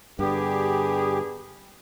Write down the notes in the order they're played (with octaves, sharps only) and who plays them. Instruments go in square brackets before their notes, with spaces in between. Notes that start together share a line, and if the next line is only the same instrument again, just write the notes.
[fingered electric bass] G2 D3 [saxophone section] B3 D4 G#4 [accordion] G4